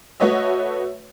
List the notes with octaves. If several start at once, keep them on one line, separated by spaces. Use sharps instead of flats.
A3 F#4 B4 C#5 D#5 E5